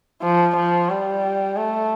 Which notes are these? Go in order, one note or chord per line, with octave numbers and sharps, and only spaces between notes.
F3
F3
G3
A3